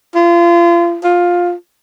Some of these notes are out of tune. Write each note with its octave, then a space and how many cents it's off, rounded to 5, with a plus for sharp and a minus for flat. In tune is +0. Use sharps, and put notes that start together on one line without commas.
F4 -30
F4 +15